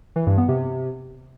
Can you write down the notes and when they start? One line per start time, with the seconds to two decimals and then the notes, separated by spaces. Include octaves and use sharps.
0.16 E3
0.27 G2
0.38 B3
0.48 C3